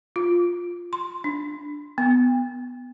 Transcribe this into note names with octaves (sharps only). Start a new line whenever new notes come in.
F4
C6
D4
B3